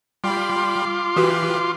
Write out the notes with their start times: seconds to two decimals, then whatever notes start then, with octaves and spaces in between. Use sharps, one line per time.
0.24 G3 F4 G5 B5 C6 D6
1.16 E3 F#4 G4 B4